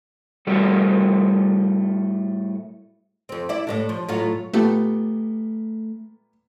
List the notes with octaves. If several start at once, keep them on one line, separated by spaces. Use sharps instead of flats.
A2 G3 A3 F#4 A4 F#5
F2 C4
E4 D5
A2 A3 D4
F3
A2 F#3 F4
A#2 A3 B3 G4